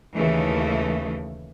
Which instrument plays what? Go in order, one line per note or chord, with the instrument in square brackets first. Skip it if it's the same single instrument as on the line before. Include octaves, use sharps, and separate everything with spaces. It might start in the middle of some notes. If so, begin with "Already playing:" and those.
[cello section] D#2 C#3 E3 A3